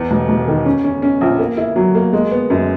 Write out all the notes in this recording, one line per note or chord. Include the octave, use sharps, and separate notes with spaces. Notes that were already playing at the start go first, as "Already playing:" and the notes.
Already playing: E2
E1
E1
D#3
C#4
C#4
C#4
A#1
A#3
E4
F#3
A#3
G#3
B3
F#2